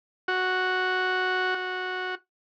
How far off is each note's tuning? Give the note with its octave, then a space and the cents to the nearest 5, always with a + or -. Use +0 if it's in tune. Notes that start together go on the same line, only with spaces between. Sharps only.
F#4 -5
F#4 -10